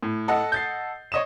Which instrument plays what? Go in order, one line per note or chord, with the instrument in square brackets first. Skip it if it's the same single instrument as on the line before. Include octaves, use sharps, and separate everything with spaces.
[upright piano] A2
[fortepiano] A4 D#5 F#5
[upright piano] G6 A6 C7
C#5 D#5 E7